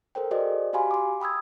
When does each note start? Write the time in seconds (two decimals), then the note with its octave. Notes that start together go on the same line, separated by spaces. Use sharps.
0.15 A4 A#4 C5 G5
0.31 F#4 G#4 C5 D5 D#5
0.73 F#4 G4 F5 G#5 B5 C6
0.91 C6 D6
1.20 G5 B5 D#6 E6 G#6